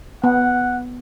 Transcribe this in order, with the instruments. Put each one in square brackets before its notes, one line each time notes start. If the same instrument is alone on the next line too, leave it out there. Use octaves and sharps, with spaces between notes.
[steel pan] B3 [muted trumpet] F#5